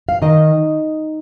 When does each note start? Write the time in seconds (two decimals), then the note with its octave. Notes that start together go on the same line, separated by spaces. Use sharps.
0.09 F5
0.22 D#3 D#4 D#5